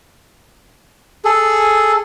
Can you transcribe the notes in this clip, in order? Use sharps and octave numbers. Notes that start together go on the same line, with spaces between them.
G#4 A4